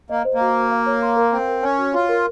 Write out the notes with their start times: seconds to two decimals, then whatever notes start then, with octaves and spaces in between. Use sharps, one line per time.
0.09 A#3 D#5
0.25 C5
0.34 A#3
0.41 F#4
0.55 F#4
0.71 F5
0.86 C#5
1.02 C6
1.17 A#4
1.32 C4 F5
1.48 A#4
1.62 C#4 G#5
1.78 F#4
1.94 F4 C#5
2.09 A#4